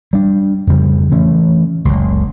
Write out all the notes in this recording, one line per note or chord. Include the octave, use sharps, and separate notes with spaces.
G3 D4
F2 C#3 G3
E3 A3 C#4
F#1 C#2